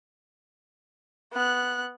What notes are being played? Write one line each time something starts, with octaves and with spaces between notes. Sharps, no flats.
B3 F#6